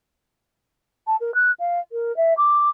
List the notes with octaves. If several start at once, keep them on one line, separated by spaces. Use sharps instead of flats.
A5
A#4
F#6
F5
A#4
E5
D6